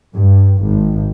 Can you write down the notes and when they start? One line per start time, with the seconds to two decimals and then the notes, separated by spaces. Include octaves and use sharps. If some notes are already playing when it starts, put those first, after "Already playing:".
0.15 G2
0.63 G#1